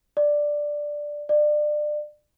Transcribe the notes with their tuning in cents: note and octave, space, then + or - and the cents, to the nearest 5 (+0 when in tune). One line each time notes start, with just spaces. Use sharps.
D5 +5
D5 +25